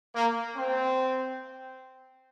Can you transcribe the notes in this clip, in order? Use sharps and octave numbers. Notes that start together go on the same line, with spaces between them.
A#3
C4